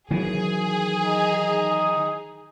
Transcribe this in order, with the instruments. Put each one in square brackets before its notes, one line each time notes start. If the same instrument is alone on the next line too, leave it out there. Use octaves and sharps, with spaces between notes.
[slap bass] D#3 E3 F#3 [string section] G#4
[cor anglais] D#4